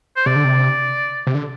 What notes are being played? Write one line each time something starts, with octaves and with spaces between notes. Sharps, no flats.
C5
C3 D5
D3
C3
C3
D3